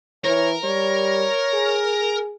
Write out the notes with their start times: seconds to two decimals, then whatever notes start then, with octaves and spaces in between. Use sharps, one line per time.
0.25 E3 A#4 C#5
0.64 G3 C#5
1.54 G#4